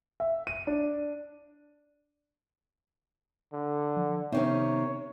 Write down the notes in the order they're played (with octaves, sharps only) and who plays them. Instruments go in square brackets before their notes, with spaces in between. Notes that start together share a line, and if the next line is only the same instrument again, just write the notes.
[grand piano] E5
D#7
D4
[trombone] D3
[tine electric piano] F3
[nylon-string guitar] C3 D#3 C#4 [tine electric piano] B3 D#4 E5 [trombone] C#5